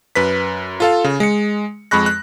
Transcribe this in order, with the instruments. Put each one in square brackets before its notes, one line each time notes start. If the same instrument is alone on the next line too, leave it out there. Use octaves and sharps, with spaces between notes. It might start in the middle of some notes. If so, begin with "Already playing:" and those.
[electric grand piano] F#2 B4 B6
F4 A4 F5
C#3
G#3 C#7
F2 G#3 B5 C#6 F#6 A#6
F#6